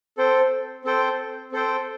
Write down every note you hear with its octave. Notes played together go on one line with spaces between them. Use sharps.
C4 A4 C5 G5
C4 A4 C5 G5
C4 A4 C5 G5